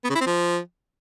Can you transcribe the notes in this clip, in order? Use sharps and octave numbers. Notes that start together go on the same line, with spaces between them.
B3
C#3
E4
C4
F3